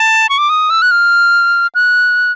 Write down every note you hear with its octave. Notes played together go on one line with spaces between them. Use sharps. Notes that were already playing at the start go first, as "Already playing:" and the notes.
Already playing: A5
C#6
D6
D#6
E6
F#6
F6
F#6